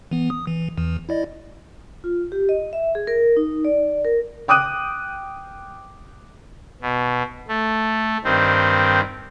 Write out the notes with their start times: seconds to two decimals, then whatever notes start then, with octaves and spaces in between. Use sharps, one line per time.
0.11 E3 B3
0.30 D#6
0.47 E3
0.78 E2 E3
1.09 E4 D5 D#5
2.04 F4
2.32 G4
2.49 D#5
2.73 E5
2.95 G#4
3.07 A#4
3.37 D#4
3.65 D5
4.05 A#4
4.48 G5 D6 D#6 F#6 D#7
6.82 B2
7.48 A3
8.24 G2 D#3 C4